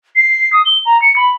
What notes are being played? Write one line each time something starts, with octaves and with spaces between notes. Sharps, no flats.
C7
D#6
G7
A#5
C#7
B5